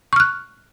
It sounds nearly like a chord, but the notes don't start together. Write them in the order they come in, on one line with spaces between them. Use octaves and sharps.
C#6 F6 F#6